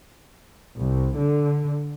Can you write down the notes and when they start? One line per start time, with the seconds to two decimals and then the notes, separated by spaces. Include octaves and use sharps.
0.77 C2
1.18 D3